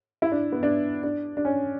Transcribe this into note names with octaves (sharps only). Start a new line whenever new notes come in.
E4
D4
B3
D4
D4
D4
C#4